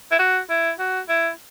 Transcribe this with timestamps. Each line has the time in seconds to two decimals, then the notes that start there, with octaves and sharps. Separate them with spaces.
0.12 E4
0.19 F#4
0.50 E4
0.79 F#4
1.09 E4